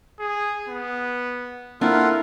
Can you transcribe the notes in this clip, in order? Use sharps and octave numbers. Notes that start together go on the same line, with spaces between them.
G#4
B3
A#3 C4 D4 E4 F4 A4 A#4 F#5